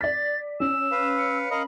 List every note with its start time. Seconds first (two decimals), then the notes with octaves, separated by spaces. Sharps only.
0.01 D5 A6 B6
0.60 C#4 E6 E7
0.91 B4 F5
1.18 C#7
1.51 A#4 D#5 F5 B5